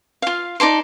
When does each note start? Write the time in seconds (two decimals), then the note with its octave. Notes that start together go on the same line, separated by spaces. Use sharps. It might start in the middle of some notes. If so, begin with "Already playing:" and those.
0.22 F4 F5
0.60 D#4 D5 A5 C6